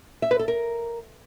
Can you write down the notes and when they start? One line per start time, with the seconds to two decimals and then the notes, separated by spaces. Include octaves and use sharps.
0.22 E5
0.31 B4
0.39 A4
0.48 A#4